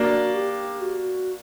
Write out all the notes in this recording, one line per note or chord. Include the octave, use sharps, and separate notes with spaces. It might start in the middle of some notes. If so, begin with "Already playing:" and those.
Already playing: A#3 D4 F#4
G4
F#4